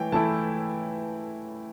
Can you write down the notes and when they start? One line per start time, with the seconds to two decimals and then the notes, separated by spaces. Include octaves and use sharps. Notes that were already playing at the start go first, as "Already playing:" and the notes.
Already playing: E3 A3 G5
0.12 E3 A3 E4 A5